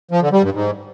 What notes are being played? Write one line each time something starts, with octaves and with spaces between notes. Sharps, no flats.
F3
D3
G3
G2
G#2